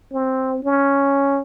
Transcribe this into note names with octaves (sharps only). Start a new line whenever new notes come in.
C4
C#4